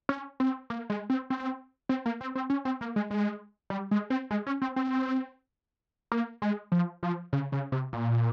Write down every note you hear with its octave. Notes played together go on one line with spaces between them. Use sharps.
C#4
C4
A#3
G#3
C4
C4
C4
A#3
C4
C4
C#4
C4
A#3
G#3
G#3
G3
G#3
C4
G#3
C#4
C4
C4
A#3
G#3
F3
F3
C#3
C#3
C3
A#2